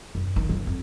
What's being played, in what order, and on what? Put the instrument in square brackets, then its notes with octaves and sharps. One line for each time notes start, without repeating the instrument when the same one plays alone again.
[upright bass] F#2
D#3
F#2
F2